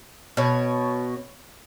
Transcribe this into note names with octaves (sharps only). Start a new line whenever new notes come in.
B2 C#5